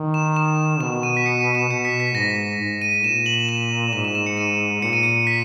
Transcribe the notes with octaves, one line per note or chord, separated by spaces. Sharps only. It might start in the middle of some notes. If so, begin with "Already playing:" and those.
Already playing: D#3
E7
E7
B2 E7
D#7
B6
C#7
D#7
E7
B2 C#7
B6
B6
G#2 A#6
G#2
D#7
A#2 E7
F#7
E7
G#2 E7
E7
E7
C#7
D#7
A#2 C#7
D#7
C#7
B6